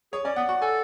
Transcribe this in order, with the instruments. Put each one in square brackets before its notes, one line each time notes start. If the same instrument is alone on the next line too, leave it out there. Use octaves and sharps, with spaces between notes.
[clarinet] G#4 [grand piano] C#5
[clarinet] C#4 [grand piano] D5
[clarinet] B3 [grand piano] F#5
[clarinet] F#4 [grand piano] F#5
[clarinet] A4 [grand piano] G#5